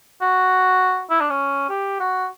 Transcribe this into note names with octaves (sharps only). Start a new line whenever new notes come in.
F#4
E4
D4
C#4
G4
F#4